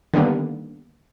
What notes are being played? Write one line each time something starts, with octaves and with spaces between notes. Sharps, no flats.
D3 D#3 G3 A#3 B3